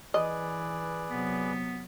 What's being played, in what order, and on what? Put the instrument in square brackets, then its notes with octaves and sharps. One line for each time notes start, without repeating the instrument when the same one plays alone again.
[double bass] E3 [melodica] G#4 B4 D5 [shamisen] D#5
[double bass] C3 F#3 [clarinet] B3